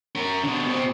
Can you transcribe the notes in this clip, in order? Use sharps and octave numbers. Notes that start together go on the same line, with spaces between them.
C#4 A#4
B2 D3
B2 C4